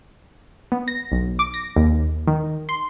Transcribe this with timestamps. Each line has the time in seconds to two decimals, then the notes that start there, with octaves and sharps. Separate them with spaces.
0.72 B3
0.88 A#6
1.12 B1
1.39 D6
1.54 A#6
1.76 D#2
2.27 D#3
2.69 C6